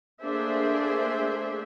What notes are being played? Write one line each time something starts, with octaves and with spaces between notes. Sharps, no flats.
A3 A#3 D4 G#4 C5 E5